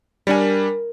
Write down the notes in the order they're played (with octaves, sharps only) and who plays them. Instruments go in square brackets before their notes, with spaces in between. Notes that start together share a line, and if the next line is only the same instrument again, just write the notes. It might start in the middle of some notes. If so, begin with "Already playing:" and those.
[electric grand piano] G3 D4 G#5 [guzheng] A#4 C#5